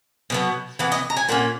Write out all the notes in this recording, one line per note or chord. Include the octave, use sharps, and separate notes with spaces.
B2 F#3 B3
E3 B3 F#5
D#5
A#5
G#5
A#2 A#3 C#4 F#5